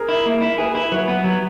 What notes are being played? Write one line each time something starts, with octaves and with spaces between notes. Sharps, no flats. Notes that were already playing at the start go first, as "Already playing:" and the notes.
Already playing: G#4 A#4
E4
A#3
E4
G#4 B4
E4
F#3 B4
B3
F#3